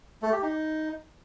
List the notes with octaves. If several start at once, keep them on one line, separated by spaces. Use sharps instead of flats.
A3
G4
D#4